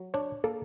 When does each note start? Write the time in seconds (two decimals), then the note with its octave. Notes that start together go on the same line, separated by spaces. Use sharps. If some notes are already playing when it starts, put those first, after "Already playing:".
Already playing: F#3
0.14 D4 C#5
0.44 A#3 A4